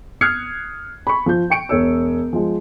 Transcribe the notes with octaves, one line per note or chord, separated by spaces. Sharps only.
D#6 F6 F#6 G#6 C7 C#7
B5 C#6
F3 G6
G5 C#6 C#7 D7
E1 C#5 E6
F3 G#3